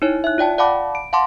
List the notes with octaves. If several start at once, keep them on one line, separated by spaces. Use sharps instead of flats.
D#4 E4 C#5
E5 F#6
F4 D5 G5 A5
D5 F5 F#5 A5 B5 D6
D7
F5 F#5 A5 C6 D6